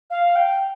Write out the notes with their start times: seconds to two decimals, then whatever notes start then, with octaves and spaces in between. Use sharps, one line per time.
0.10 F5
0.35 G5